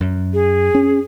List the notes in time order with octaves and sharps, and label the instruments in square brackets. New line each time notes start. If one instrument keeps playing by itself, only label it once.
[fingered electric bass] F#2
[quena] G#4
[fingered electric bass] C#4